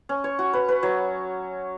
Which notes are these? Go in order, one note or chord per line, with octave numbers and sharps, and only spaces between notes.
C#4
C#5
F#4
B4
B4
F#3